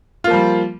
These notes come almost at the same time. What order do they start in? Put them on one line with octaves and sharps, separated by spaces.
F4 A#3 F3 G3